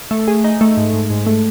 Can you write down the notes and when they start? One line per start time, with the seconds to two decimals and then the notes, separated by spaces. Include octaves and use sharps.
0.11 A3
0.28 G#4
0.44 D#4
0.61 A3
0.77 G#2
0.93 G#2
1.10 G#2
1.27 A3